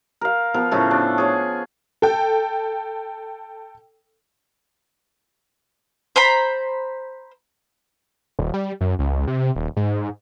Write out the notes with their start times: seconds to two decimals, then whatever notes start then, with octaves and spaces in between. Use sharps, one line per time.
0.21 A#4 F5
0.54 F3 B3 A#4
0.71 A2 C#3 F3 A3
0.91 D4
1.18 G#4 C#5
2.02 A4 G5
6.16 C5 A#5 B5
8.39 D#1
8.54 G3
8.81 F#2
8.99 C#2
9.27 C3
9.56 D#1
9.77 G#2